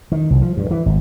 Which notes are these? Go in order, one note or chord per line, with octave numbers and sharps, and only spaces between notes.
D#3
C2
F3
G2
E3
G#1